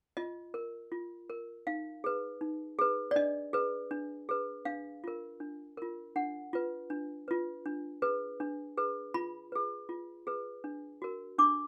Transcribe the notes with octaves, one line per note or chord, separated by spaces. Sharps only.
F4 D#5
A#4
F4
A#4
D#4 F5
G#4 B4
D#4
G#4 B4
D5
D4 D#5
G#4 B4
D4
G#4 B4
D4 F5
F4 A#4
D4
F4 A#4
D4 F#5
F4 B4
D4
F4 B4
D4
G#4 B4
D4
G#4 B4
F4 B5
G#4 B4
F4
G#4 B4
D4
F#4 A#4
D4 D6